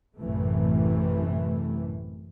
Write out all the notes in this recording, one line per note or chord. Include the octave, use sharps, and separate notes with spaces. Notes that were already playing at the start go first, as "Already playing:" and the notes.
A1 F#2 C3 E3 A3